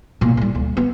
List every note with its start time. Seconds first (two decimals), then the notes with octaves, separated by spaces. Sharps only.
0.21 B1 A#2
0.37 A2 G3
0.55 D2
0.77 B3